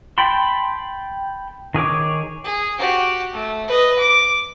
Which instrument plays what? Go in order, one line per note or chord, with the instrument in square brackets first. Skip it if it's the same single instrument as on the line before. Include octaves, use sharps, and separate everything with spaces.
[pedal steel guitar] G5 A5 B5 C6
D#3 G#4 C#5 D6
[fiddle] G#4
F#4 G4
A3
B4 D#5
D6